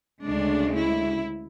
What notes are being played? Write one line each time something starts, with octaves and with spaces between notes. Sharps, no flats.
D2 C#3 G#3 D4
E4